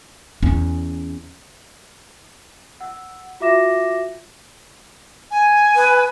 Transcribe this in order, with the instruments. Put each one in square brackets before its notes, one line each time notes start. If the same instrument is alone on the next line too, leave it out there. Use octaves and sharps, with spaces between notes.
[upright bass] E2 C#4
[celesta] F#5 E6
F4 F#4 E5 D6 A#6 E7
[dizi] G#5
[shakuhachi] B4